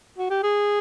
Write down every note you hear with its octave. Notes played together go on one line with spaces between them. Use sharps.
F#4
G4
G#4